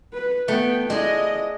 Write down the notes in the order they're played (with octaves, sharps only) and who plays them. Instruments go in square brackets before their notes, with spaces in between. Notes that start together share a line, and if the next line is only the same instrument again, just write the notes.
[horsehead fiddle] B4
[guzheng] A3 [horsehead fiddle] B3 G5
[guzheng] G#3 D4 G#4 [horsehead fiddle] E4 D#5